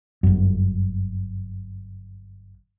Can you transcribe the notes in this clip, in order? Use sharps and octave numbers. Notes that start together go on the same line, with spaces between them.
G1 F#2